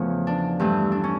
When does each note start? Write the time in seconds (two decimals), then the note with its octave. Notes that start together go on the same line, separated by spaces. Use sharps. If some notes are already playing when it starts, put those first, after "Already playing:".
Already playing: E2 C#3 F3 A3 C#4
0.27 D4
0.59 G2 E3 A3
0.92 D4
1.04 C#4